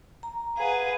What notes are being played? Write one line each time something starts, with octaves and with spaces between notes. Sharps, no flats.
A#5
G#4 B4 F5 F#5